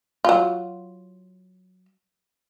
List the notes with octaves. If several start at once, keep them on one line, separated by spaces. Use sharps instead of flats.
F#3 F4